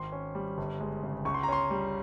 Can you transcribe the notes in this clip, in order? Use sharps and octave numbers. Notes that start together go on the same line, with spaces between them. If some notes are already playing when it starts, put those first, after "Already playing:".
Already playing: G#1 C6
C#4
G3
G1
G#3
C#3
C#2 C#6
C6
A#5
C#4 C6
G3